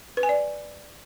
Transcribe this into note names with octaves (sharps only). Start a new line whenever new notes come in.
B4
G#5
D5